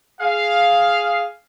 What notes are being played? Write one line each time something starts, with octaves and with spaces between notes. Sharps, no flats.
G#4 F5